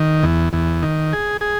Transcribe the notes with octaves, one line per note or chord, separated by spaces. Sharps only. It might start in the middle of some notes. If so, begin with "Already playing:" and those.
Already playing: D#3
E2
E2
D#3
G#4
G#4